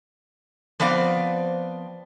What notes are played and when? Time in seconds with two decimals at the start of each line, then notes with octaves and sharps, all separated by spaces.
0.80 F3 B3 C4 D5 F5